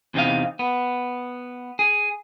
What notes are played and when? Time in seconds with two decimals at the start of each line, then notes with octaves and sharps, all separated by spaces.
0.14 E2 C3 C4 D#4 F5
0.59 B3
1.79 G#4